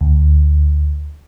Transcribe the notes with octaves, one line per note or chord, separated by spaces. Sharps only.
D2